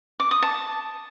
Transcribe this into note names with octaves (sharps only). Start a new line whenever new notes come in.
D6
D#6
A5